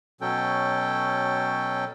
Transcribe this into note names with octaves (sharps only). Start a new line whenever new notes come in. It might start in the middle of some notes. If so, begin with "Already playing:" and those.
B2 F#3 C#4 A4 G5